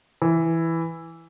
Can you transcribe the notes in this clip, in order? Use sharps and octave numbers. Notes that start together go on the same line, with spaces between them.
E3